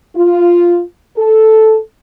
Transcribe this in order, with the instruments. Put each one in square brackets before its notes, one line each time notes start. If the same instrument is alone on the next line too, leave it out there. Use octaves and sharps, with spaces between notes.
[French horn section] F4
A4